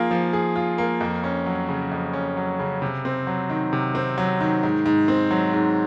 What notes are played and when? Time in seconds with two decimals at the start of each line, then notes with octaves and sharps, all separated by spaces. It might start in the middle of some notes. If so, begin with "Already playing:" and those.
Already playing: F3 A#3 F4 G#4
0.11 F3
0.33 G#4
0.56 F4
0.78 A#3
1.01 F2
1.24 C#4
1.46 F#3
1.69 C#3
1.91 F2
2.13 C#4
2.37 F#3
2.60 C#3
2.82 C3
3.05 C4
3.27 F#3
3.50 D#3
3.73 C3
3.95 C4
4.18 F#3
4.40 D#3
4.63 G#2
4.86 G#2
5.08 C4
5.31 F#3
5.53 G#2